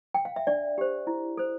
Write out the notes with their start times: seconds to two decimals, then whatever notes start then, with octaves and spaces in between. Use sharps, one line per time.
0.14 G5
0.25 F5
0.36 E5
0.47 D4 D5
0.78 G4 C5
1.07 E4
1.38 A4 C5